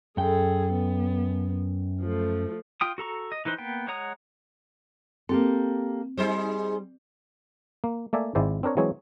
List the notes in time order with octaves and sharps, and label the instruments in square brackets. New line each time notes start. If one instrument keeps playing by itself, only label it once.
[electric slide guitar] F#2 G5 [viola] G#4 A4
[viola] B3
F3 A3
[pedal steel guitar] F4 G5 D#6
F#4 A4 A#5 C#6
D#5
E3 D#4 B4 C5
A#3 B3 G5
G#3 C#5 F#5 A#5 D#6
[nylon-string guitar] A#3 G4 A4 [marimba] C4
[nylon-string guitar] G3 [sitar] D#4 G#4 C5
[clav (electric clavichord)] A#3
A3 A#3 D5 E5 G#5
G#1 G#3 E4 C5 D5
C4 D4 A#4 C#5
E3 F#3 G#3 C4 G#4 C#5